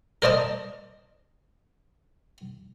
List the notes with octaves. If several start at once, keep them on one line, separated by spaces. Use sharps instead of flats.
A#4 C5 D5 D#5 A5